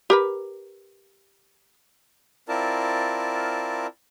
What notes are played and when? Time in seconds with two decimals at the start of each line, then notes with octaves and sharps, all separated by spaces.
0.10 G4 A#4 B4
2.49 C4 E4 F4 A#4 D5 A5